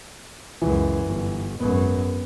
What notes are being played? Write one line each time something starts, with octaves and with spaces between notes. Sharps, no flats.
C#2 F#2 E3
G1
G#1 F#2 B3